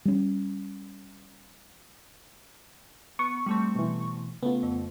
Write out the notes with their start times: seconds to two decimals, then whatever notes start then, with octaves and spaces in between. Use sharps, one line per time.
0.05 G3 C#4
3.19 B3 C#6
3.46 G3 A3 C4
3.75 B2 E3
4.43 C#3 A3 B3 F4
4.63 F2